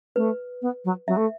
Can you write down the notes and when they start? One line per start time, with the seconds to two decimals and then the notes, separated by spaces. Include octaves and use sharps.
0.16 A3 B4
0.62 B3
0.84 F#3
1.07 F#3 E5
1.16 A3